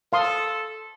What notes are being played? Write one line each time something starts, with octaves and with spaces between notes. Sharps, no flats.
A4 F5 C6 D#6